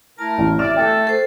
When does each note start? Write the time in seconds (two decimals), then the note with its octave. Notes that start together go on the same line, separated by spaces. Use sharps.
0.19 A3 E4 A#4 A5
0.38 A1
0.59 D5 E5 F6
0.76 A3 A4 G5
1.07 A4 C5